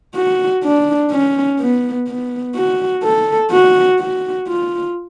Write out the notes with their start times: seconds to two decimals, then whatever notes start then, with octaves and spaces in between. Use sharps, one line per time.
0.15 F#4
0.64 D4
1.12 C#4
1.60 B3
2.08 B3
2.56 F#4
3.04 A4
3.52 F#4
4.00 F#4
4.48 F4